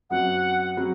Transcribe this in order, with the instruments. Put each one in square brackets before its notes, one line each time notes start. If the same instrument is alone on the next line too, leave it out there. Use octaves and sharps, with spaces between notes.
[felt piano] F#2 F#3 C4 [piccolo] F#5
[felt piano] F#3 C4